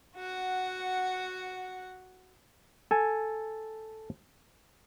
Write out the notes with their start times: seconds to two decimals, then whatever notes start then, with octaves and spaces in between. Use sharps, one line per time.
0.15 F#4 F#5
2.91 A4 G#5